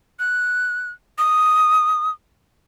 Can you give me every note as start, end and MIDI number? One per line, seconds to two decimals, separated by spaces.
0.19 0.90 90
1.18 2.10 87